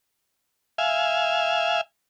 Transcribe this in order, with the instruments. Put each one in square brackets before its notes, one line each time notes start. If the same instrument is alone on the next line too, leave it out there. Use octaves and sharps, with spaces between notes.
[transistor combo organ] E5 F5 G#5